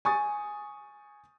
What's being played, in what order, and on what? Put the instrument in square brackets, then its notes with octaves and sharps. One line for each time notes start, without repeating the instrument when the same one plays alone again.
[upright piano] G#5 C#6 D#6 A6